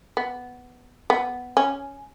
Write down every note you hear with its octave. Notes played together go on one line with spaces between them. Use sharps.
B3
B3
C#4